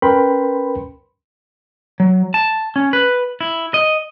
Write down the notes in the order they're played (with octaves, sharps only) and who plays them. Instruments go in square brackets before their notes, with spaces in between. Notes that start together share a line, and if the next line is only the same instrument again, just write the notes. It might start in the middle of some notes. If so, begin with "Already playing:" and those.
[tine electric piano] C#4 A#4 B4 G5 B5 C6
[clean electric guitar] F#3
A5
C#4
B4
E4
D#5